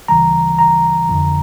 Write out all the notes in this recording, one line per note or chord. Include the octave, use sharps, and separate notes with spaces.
D2 C#3 E3 G3 A#5
A#5
F2 D3 F3